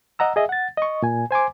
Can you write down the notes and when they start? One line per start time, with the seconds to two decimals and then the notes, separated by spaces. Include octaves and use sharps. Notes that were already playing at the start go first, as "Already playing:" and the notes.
0.19 D#5 F#5 A#5 E6
0.36 G#4 D#5 E5
0.49 F#5 A6
0.77 D#5 C#6
1.03 A#2 G#5
1.31 C5 G#5 C6 D6